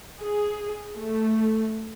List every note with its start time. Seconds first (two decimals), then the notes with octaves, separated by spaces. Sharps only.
0.21 G#4
0.98 A3